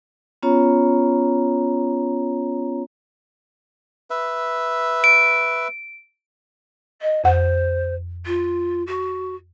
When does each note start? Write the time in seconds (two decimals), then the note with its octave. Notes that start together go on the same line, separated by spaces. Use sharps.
0.43 B3 C#4 F4 C#5 A#5
4.10 B4 E5
5.04 D7
7.01 D#5
7.24 F2 C5 F#5
8.25 F4
8.87 F#4